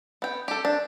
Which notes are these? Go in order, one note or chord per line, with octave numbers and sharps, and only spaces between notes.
B3 G5
G4 A4
D4